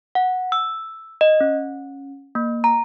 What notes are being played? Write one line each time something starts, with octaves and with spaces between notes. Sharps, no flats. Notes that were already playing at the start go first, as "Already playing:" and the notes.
F#5
E6
D#5
C#4
A#3
A#5